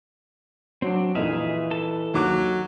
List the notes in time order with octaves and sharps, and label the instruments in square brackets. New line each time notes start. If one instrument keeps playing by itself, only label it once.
[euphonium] F#3 [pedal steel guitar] C4 D4
[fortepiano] F2 A#2 D#4 [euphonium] E3 [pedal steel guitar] G#4 E5 F5
[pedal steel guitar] A4 A5
[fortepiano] D#2 D6 F#6 [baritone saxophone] F#3